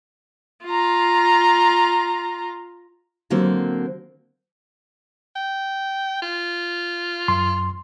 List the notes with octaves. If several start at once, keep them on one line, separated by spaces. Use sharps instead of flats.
F4 A#5
D3 F#3 A#3 C4 C5
G5
F4
F#2 C6